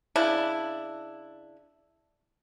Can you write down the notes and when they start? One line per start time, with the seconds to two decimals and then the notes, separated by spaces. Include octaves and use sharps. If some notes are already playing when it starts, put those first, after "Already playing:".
0.16 C#3 D4 E4